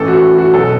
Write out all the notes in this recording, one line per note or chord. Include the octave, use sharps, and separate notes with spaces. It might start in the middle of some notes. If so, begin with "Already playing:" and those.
Already playing: A1 A2 E3 A4
F#4
F#4
B2 F#3 A4